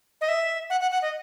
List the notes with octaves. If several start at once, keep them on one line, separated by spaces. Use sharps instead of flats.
D#5
E5
F#5
F#5
F#5
D#5